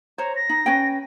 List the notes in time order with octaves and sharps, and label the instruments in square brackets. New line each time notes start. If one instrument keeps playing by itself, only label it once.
[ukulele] C5 C#5 [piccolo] A#5
[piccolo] A#6
[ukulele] D#4
C#4 B4 G5